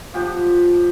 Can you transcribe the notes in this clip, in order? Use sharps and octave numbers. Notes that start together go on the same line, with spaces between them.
F3 G4 F#5